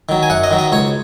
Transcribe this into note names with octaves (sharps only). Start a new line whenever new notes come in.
D#3 F#3
G#5
F#2 F#5
D#5
D#3 F#3
D#5
C#2 C#5